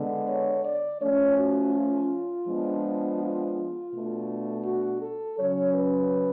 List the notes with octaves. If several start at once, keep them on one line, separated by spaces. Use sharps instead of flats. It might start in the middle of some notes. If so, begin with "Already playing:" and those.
Already playing: D3 G#3 B3
C#5
D5
F3 A3 C#4 C#5
F#4
F4
F3 G#3 B3 D4
F4
B2 A3 D4
F#4
A4
C#3 F#3 C#4 C#5
B4